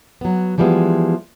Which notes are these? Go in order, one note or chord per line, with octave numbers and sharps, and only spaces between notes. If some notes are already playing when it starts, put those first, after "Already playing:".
F#3 B3
E3 F3 G3 G#3 B3